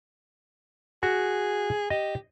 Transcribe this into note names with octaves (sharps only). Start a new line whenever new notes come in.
F#4 G#4
G4 D#5